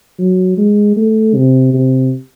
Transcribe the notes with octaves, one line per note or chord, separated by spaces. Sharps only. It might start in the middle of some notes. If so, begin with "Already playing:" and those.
F#3
G#3
A3
C3
C3